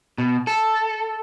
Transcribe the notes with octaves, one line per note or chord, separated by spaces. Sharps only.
B2
A4